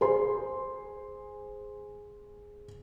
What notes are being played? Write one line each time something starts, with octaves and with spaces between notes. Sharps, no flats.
G#4 C5 C6